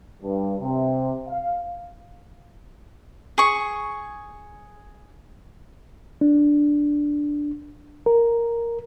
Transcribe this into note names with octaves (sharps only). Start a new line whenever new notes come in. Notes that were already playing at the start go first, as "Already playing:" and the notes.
G2
C3
F5
G#4 C#6
D4
A#4